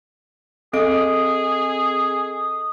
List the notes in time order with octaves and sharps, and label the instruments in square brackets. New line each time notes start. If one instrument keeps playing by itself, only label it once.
[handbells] C4 D7 [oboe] G#4 [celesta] A4 D#5 [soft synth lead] D#6